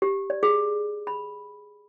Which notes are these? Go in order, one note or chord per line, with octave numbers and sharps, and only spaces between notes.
G4
D5
G#4
B5